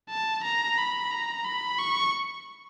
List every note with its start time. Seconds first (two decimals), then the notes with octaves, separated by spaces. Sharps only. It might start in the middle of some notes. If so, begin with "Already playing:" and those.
0.10 A5
0.45 A#5
0.78 B5
1.11 A#5
1.45 B5
1.79 C#6